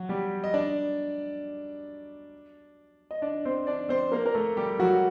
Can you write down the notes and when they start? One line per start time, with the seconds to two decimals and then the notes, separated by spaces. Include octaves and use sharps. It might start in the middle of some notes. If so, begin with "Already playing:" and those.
Already playing: F#3 F#4
0.09 G3 G4
0.44 D#5
0.54 D4 D5
3.11 D#5
3.22 D4 D5
3.45 C4 C5
3.67 D4 D5
3.89 C4 C5
4.12 A#3 A#4
4.26 A#4
4.35 A3 A4
4.57 G3 G4
4.79 F#3 F#4